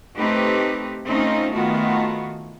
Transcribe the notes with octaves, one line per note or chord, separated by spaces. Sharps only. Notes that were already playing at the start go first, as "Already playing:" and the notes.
A3 C4 D#4 G4 B4
A3 C4 C#4 D#4 F4
D#3 A3 B3 F4 F#4